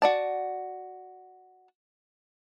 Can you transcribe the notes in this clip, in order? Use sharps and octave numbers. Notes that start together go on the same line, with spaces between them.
F#4 D5 A5